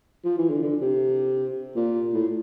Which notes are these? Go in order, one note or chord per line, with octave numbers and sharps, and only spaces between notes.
F3
E3
D3
D3
C3
A#2
A2